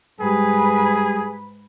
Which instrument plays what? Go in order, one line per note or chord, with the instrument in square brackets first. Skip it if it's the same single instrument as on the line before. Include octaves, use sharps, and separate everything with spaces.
[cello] G#2 B4 [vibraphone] G3 G#3 G4 [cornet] G#4